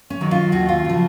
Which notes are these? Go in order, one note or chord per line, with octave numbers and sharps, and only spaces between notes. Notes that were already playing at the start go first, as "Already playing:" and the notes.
C#4
D#3 F#3
F4
D#2 F#4
F4
C#3 F3